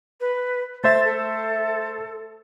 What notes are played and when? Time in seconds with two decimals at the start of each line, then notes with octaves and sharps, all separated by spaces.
0.21 B4
0.84 A3 C5 E5 A6
1.05 A4